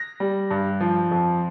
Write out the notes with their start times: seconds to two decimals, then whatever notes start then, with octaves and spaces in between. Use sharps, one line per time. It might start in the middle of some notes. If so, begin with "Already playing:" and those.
Already playing: A#6
0.20 G3
0.51 G2
0.80 F3
1.11 F2